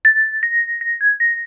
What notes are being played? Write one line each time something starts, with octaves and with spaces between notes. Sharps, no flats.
A6
A#6
A#6
G#6
A#6